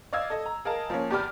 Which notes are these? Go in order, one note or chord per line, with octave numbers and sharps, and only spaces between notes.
D5 D#5 F5 E6 G#6
A4 D#5
A#5
G#4 A#4 D#5 F5 A5
F3 A#3 C#4
E2 G4 D5 B5 D6 F6